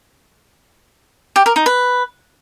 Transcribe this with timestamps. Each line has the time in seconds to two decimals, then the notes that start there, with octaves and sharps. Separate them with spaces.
1.36 G4
1.46 A#4
1.56 D#4
1.66 B4